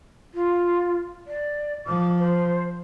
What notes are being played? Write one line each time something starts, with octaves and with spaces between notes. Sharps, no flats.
F4
D5
F3 D6
C5